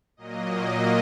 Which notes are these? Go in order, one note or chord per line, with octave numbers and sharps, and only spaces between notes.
A#2 F#3 A#3 D#5